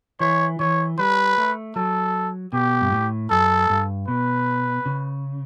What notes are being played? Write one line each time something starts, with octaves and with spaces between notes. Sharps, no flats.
E3 C#5
E3 C#5
G3 B4
A3
F#3 A4
B2 G4
G2
A2
F#2 A4
G2
B2 B4
C#3